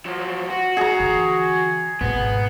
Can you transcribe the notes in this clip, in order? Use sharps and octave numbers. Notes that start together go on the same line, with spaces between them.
F3 F#3
F#4
G#4 A#5
D3 E3
G#1 B2 B3